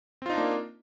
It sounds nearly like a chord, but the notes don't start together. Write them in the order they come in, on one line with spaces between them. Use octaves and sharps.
C4 F4 D#4 D4 A#3